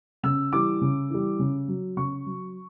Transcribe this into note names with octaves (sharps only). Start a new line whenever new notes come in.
C#3 E6
E3 G3 D6
C#3
E3 G3
C#3
F#3
C#3 C#6
F#3